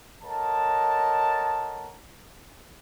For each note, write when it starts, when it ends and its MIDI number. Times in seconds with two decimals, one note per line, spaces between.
0.23 1.98 69
0.23 1.98 70
0.23 1.98 73
0.23 1.98 75
0.23 1.98 78
0.23 1.98 81